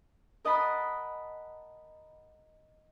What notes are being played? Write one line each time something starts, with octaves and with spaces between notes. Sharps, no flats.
A#4 D#5 F#5 A5 B5 D#6